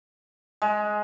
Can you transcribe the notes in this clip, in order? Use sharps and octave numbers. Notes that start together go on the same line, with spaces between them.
G#3